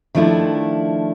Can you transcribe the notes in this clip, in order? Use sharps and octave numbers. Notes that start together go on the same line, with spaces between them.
D#3 F3 A3 D4 E4